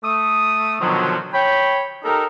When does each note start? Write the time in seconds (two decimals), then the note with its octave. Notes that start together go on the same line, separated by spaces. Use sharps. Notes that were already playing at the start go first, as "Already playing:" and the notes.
0.03 A3 D#6
0.79 B2 D3 D#3 F3 F#3
1.33 C#5 G5 B5
2.04 D#4 G4 A4 A#4